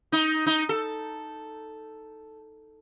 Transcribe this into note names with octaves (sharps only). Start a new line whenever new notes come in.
D#4
D#4
A4